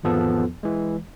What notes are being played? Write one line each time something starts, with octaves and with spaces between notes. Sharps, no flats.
G#1 E2 F3 B3 A4
E3 G#3